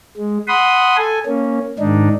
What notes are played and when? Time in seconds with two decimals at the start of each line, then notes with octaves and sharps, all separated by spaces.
0.17 G#3
0.47 F#5 B5 C6 D#6
0.97 A4 G#5
1.26 A#3 C#4
1.79 G#2 D#3 D4 D#4